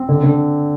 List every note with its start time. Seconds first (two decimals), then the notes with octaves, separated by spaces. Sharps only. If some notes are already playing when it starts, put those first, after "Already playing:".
Already playing: C4
0.09 D3
0.23 D3